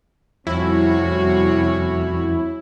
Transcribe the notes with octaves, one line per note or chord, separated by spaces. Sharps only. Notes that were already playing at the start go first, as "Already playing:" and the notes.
F2 A2 C3 G3 C#4 E4 F#4 C#5